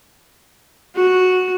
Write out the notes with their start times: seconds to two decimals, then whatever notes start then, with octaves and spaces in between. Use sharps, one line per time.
0.95 F#4